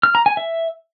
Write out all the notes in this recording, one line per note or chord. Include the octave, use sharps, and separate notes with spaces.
F6
A#5
G#5
E5